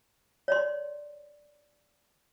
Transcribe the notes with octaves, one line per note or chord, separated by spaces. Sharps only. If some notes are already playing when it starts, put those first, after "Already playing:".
C#5 D5 C6